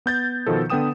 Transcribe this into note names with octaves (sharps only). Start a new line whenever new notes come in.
B3 G6 A6
B2 D#3 F3 A4
D3 B3 B4 G5 D#6 E7